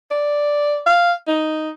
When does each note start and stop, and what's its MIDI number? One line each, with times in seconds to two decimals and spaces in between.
0.11 0.81 74
0.86 1.12 77
1.28 1.70 63